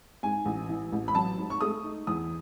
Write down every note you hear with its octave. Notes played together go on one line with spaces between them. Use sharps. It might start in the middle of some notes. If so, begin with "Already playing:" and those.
G#2 G#5
A1
E3
A1
B5
F#3 A5
G#2
C#6
A3 D#6
D#4
E2 D#6